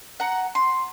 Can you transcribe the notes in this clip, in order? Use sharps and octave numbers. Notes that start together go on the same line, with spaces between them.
F#5 A#5
C6